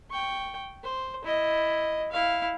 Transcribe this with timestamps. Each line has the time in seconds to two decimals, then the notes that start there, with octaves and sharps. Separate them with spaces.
0.11 G5 C#6
0.84 C5
1.25 E4 D#5
2.12 E4 F5